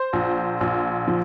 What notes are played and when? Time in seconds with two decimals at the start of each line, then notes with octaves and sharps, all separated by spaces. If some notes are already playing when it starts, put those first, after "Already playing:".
Already playing: C5
0.13 A#1
0.61 A#1
1.08 F3